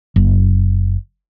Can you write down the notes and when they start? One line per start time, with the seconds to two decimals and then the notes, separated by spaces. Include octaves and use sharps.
0.16 F#1